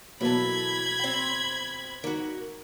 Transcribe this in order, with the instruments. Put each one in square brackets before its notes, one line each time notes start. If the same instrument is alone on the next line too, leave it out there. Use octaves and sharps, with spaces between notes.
[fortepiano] B2 F#3 A#3 [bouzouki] E3 A4 [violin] B5 G#6
[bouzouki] C4 G5
[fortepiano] D#3 [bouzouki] A#3 F#4